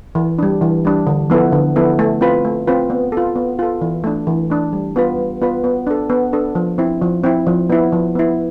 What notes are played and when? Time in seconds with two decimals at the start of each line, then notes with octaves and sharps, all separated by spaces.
0.15 E3
0.38 G3 D4
0.62 E3
0.85 G3 D4
1.07 D3
1.30 F3 B3 E4 A4
1.52 D3
1.76 F3 B3 E4 A4
1.99 A3
2.21 C4 F4 B4
2.45 A3
2.67 C4 F4 B4
2.90 B3
3.12 F4 A4
3.36 B3
3.59 F4 A4
3.82 E3
4.04 A3 D4
4.27 E3
4.50 A3 D4
4.73 G3
4.96 B3 F4 B4
5.18 G3
5.41 B3 F4 B4
5.64 B3
5.87 D4 A4
6.10 B3
6.33 D4 A4
6.55 F3
6.78 C4 E4
7.02 F3
7.24 C4 E4
7.47 F3
7.70 B3 E4
7.92 F3
8.15 B3 E4